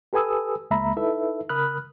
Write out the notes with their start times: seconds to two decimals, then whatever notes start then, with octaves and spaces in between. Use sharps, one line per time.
0.13 G4 A4 B4 G#5 D#6 E6
0.71 C#2 G#3 A#3 E5 A#5 B5
0.97 D#4 E4 A4 B4 E5
1.49 C#3 A#4 B5 D#6 F6 F#6